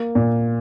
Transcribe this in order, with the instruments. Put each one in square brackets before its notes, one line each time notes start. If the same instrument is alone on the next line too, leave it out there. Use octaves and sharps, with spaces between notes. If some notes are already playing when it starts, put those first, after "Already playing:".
Already playing: [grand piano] A#3
A#2